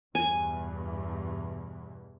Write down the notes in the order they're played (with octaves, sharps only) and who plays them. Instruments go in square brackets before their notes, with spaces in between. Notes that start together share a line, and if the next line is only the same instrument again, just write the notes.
[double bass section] E2 G2 B2 [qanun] G#5